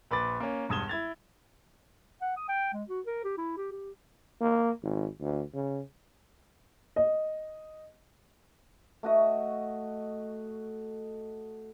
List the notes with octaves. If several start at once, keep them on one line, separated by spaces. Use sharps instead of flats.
A#1 B4 D6 A6
A#3 C#4
E1 G2 D#6 G#6 E7 G7
E4 G#6 A6 F7
F#5
D#6
G5
G#3
F#4
A#4
G4
E4
G4
G4
A#3
G#1
D2
C#3
D#5
A3 F#4 D#5